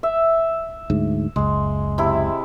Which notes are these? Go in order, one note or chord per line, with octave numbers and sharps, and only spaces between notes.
E5
D2 G#2
F#1 C#2 G#3
C3 E4